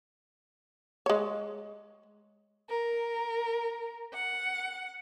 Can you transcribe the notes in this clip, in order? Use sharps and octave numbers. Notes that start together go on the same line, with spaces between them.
G#3 C#5
A#4
F#5